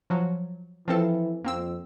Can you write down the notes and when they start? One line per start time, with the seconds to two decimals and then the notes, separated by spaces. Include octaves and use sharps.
0.10 F3 F#3
0.88 E3 F3 C4 A4
1.45 F2 A#3 C4 E6